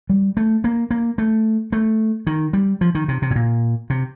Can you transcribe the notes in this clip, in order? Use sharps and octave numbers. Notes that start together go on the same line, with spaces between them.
G3
A3
A#3
A#3
A3
A3
D#3
G3
F3
D#3
C3
C3
A2
A#2
C3